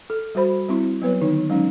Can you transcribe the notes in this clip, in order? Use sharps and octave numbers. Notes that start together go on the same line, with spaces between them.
A4
G3 F#4 C5 B5
G3 C4 E4 C6
F#3 B3 B4 C#5
D3 D#3 D#4
F#3 G#3 C#4 D#4